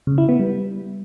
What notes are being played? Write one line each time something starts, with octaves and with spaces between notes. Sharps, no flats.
C#3
E4
B3
G3